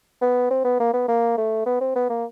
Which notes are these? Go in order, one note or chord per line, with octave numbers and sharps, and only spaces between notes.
B3
C4
B3
A#3
B3
A#3
A3
B3
C4
B3
A#3